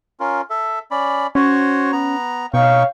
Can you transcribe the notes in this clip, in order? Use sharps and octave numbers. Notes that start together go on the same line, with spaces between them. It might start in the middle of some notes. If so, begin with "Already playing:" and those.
C#4 F4 A#4
A4 E5
C#4 D5 B5
C#4 F#4 C5 C#5
B3 A#5
B2 D#4 C#5 F5 G5 C#6